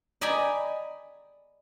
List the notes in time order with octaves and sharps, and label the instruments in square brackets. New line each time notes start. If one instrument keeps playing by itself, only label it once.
[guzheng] D5 D#5 G5 G#5 A#5 B5